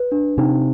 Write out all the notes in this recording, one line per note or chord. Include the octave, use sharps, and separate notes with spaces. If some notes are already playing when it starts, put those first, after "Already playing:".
Already playing: B4
D4
C3 D#4